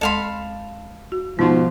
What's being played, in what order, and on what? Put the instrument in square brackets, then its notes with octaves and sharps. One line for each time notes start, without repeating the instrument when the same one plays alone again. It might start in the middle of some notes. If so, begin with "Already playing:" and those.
[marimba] D2 G#3 C6 [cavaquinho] A4 F5 B5
[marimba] F#4
[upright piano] G#2 B2 [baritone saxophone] F3 [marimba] B3 D#4